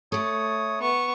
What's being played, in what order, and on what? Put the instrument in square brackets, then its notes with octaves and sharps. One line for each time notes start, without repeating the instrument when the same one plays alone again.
[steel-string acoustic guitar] A3 A4 [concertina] C#5 D#6
[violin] B3 C#6